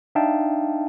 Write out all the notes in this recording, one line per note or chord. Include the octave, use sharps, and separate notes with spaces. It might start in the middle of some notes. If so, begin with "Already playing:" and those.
D4 D#4 E5 F5 G5 A5